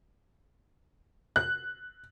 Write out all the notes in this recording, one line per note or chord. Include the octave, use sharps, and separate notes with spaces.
F#6